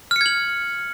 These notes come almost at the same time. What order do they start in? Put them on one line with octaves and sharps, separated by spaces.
F6 C#7 G#6 F#7